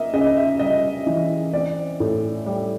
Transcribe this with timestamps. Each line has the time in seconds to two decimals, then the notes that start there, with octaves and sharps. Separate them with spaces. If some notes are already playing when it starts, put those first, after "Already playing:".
Already playing: A#3 D#5 E5
0.13 C#3 D#5
0.37 E5
0.60 G3 D#5
1.07 E3
1.53 C4 D5
2.00 A2
2.46 G3